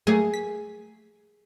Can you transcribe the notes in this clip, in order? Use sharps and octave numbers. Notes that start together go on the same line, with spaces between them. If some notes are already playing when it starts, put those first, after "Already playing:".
F#3 A3 A#3 G#4
B6